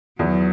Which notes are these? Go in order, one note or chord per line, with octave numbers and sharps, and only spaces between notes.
E2 F#3